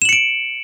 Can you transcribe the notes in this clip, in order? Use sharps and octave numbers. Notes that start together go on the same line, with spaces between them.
C#7 D7 E7 F#7